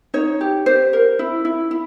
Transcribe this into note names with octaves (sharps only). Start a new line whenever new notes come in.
D#4 C#5
G4
G4 C5
A#4
E4
E4
E4